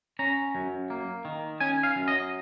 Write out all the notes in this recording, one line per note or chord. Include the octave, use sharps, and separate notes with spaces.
C#4 A#5
F#2
A#3
D#3
C#4 G#5
F5
F#2
D#5